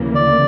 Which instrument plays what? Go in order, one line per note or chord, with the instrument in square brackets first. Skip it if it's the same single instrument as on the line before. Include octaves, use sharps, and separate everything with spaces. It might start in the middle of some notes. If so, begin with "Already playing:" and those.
Already playing: [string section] D2 C#3 E3 A#3
[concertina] D5